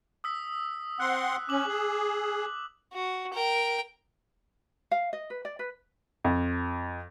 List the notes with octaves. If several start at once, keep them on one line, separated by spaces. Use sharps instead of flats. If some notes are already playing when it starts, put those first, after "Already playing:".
D#6 E6 B6
C4 F#5 C6 F#6
C#4 D6 F#7
G#4
F#4
A#4 G5
F5
D#5
B4
D5
B4
F2